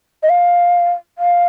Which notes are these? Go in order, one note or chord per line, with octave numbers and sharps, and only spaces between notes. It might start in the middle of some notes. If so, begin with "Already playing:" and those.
D#5
F5
F5